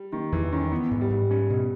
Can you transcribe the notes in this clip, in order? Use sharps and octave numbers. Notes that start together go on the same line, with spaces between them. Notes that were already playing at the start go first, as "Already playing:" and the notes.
Already playing: G3
D#3 A#3
E2 E3
D#3 C#4
E3 B3
G#2
G3
G#2
G3 C#4
B2